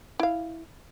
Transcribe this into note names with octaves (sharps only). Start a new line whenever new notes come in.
E4 F5